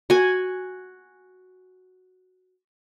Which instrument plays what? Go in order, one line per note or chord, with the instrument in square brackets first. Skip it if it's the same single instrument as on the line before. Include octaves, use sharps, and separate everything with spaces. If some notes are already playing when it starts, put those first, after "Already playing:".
[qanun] F#4 G#5